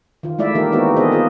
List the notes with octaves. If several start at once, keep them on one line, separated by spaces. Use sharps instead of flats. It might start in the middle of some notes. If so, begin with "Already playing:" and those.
D#3 F4
G#3 A3 E4 D5 E5
D#3 E3 A#3 D#4 G4 A#4
G#3 B3 C4 D#4 F#4
B3 C4 G#4 A4 D#5
B3 C4 F4 G4 G#4